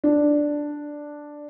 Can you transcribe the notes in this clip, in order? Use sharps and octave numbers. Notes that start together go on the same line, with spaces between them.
D4